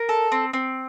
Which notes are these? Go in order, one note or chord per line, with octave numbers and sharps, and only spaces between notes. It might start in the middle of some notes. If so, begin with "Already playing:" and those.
Already playing: A#4
A4
C4
C4